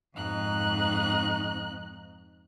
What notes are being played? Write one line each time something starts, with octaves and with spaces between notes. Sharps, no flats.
F2 G#2 D#4 F#6